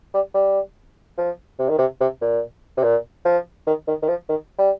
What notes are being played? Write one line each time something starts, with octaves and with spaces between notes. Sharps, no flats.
G3
G3
F3
C3
D#3
C3
C3
A#2
C3
A#2
F3
D#3
D#3
D#3
F3
D#3
G3